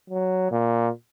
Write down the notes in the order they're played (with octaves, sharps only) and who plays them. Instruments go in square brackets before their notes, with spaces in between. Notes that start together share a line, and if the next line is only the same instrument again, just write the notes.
[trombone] F#3
A#2